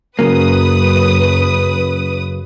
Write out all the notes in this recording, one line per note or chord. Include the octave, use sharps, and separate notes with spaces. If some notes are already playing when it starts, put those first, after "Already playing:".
F#2 C#3 F#3 A#3 B4 D#6